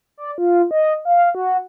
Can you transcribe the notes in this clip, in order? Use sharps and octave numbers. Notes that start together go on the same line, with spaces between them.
D5
F4
D#5
F5
F#4